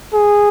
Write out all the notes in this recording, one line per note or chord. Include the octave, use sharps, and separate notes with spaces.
G#4